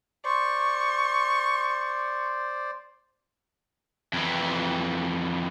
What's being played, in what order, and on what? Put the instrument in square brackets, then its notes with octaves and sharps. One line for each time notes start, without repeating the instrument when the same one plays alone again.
[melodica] C5 D5 [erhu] C#6
[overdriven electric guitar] F2 E3